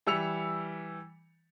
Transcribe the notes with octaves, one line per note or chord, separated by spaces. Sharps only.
E3 G3 E6 C#7 F7